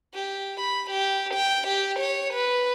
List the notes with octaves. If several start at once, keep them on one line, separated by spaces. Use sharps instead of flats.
G4
B5
G4
G5
G4
C#5
B4